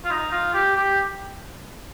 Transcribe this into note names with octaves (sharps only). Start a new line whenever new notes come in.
F4
D#4
F4
G4
G4